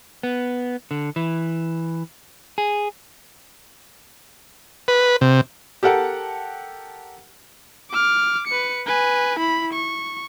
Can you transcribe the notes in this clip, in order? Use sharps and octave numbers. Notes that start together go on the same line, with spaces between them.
B3
D3
E3
G#4
B4
C3
G4 A4 A#4 F#5 A5
D6 F6
B4 C#7
B4 G#5
E4 B5
C#6